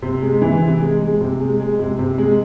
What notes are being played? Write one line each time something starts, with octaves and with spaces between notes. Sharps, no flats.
C3
G#3
E3
C3
G#3
G#3
C3
G#3
G#3
C3
C3
G#3